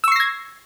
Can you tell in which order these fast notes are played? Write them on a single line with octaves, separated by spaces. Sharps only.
E6 C#6 C7 A#6 G#6